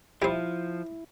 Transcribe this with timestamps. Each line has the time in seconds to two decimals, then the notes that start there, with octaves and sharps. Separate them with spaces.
0.22 F3 G3 E4 C5